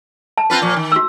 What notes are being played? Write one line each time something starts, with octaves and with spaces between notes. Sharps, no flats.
A5
C4 F4 B4
A#2 F3
D#3
F#4 E6